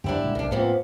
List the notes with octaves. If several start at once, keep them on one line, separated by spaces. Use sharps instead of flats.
F#2 D3 F#3 D4 E4 G4
A#2 D3 G#3
B1 C3 D#3 D4
F2 A2 F3 A#3 B3